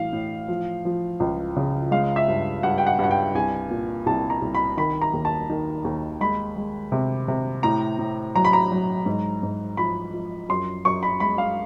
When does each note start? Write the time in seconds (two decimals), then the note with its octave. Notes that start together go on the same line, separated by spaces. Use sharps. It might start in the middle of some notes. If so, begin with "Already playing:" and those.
Already playing: A2 E3 F5
0.13 A2
0.48 F3
0.85 F3
1.20 C#2
1.56 C#3
1.91 G#3 F5
2.16 E5
2.28 G2
2.63 G2 F#5
2.78 G5
2.87 F#5
2.99 G2 F#5
3.11 G5
3.34 C2 G#5
3.70 A#2
4.06 C2 A5
4.30 A#5
4.42 C2
4.55 B5
4.77 D#3 B5
5.02 A#5
5.13 D#2
5.25 A5
5.50 D#3
5.84 D#2
6.21 G#3 B5
6.56 G#3
6.92 C3
7.28 C3
7.63 A2 A#5
7.99 A2
8.36 F#3 A#5
8.45 B5
8.53 A#5
8.71 F#3
9.06 G#2
9.43 G#2
9.77 F3 B5
10.13 F3
10.49 F#2 C6
10.85 F#2 C#6
11.03 B5
11.20 G#3 B5
11.38 F5